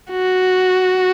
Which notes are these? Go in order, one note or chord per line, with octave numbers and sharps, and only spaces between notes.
F#4